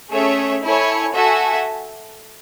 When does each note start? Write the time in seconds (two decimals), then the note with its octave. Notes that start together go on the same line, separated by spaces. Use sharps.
0.11 A3 C#4 G#4 C#5 E5
0.62 E4 A4 C#5 G#5
1.14 F#4 A4 E5 G#5